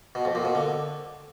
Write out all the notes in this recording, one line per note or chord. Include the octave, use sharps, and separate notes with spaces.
B2
F2
A#2
B2
D3